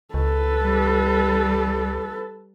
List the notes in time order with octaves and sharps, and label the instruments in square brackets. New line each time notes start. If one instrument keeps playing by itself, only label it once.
[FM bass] C#2 [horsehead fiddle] A4 B4
[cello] G3